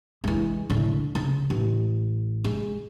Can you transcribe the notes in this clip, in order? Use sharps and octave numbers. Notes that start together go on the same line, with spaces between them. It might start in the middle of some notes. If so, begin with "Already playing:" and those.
E3 G#3
A2 D3
C#3
A1
G#3